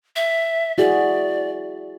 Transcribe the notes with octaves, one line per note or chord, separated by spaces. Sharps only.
E5
E4 F#4 G#4 D5